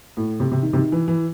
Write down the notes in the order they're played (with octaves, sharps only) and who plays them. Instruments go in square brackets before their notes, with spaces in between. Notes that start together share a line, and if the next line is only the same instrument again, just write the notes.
[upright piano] A2
C3
C3
D#3
C3
D#3
E3
E3